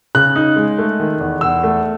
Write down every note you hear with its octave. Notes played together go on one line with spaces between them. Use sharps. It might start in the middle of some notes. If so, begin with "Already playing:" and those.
C#3 F#6
D#4
G#3
A3
D#3
E2
E2 E6
A3